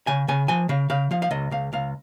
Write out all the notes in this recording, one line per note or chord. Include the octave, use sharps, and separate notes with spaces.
C#3 G#5
C#3 G#5
F3 G#5
C#3 F5
C#3 F5
F3 F5
F5
C#2 D#5
C#2 F5
C#2 F5